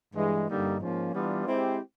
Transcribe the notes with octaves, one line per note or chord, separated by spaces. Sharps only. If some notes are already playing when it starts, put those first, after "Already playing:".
G2 E3 G#3
G2 D3 G3 A#3 D#4
G#2 F3 A#3 C#4
E3 G3 B3 D4 F4
G#3 C4 E4 G4 C5